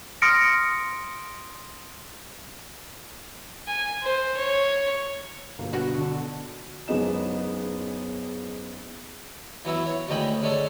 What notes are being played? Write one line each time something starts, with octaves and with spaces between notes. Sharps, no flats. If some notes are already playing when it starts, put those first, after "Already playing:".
C6 D#6 F6 A#6 C#7 D7
G#5
C5
C#5
G1 B2 D3 A#3
B2 D4 F#4
D3 D4
F#1 C#3 G#3 B3 D#4 E7
E3 F#3 B3 E4
C#5
D2 G#2 C#3 D#5 G5 B5
D3 G#3 C#4 G#4 A4